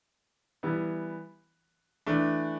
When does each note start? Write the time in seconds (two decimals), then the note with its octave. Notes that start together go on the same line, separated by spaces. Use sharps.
0.63 E3 G3 B3 E4
2.06 E3 A3 D4